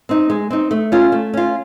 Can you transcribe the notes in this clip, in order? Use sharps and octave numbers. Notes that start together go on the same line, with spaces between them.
C4 D#4
G#3
C4 D#4
A3
C#4 F4
A3
C#4 F4